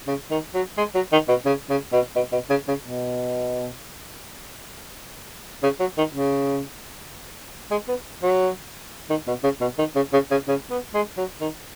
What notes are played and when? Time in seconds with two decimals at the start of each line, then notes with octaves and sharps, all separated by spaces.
0.07 C#3
0.31 D#3
0.54 F#3
0.77 G#3
0.95 F#3
1.12 D#3
1.28 B2
1.46 C#3
1.70 C#3
1.92 B2
2.16 B2
2.32 B2
2.50 C#3
2.68 C#3
2.85 B2
5.63 C#3
5.80 F#3
5.98 D#3
6.14 C#3
7.71 G#3
7.88 B3
8.23 F#3
9.10 D#3
9.27 B2
9.43 C#3
9.61 B2
9.78 D#3
9.95 C#3
10.13 C#3
10.31 C#3
10.48 C#3
10.71 B3
10.94 G#3
11.17 F#3
11.41 D#3